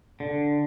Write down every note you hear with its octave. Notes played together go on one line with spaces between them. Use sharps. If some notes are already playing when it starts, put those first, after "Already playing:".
D3